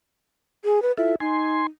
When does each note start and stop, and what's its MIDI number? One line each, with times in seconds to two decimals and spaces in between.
0.64 0.82 68
0.82 0.92 71
0.98 1.15 64
0.98 1.15 65
0.98 1.15 69
0.98 1.14 76
1.20 1.63 63
1.20 1.67 80
1.20 1.67 84